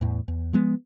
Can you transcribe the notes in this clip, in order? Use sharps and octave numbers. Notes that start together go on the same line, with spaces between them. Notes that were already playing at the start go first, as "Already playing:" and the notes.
E2 A2
E2
F3 G#3 B3